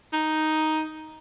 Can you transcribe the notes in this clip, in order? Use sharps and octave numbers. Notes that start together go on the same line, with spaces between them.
D#4